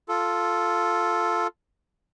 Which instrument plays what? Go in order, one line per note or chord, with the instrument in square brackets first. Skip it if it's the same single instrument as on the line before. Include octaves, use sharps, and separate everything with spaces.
[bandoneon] F4 A4